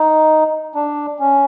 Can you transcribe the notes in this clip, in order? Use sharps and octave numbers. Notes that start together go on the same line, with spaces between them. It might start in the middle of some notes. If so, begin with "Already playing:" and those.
Already playing: D#4
D4
C#4